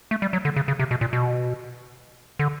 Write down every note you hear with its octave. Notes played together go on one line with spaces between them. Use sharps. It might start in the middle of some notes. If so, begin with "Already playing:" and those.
A3
G3
F#3
D3
C#3
C#3
C3
B2
A#2
B2
D3